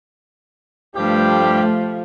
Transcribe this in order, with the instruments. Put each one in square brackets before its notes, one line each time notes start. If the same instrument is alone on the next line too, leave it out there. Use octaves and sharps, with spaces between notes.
[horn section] G2 G4 [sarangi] F3 [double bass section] A3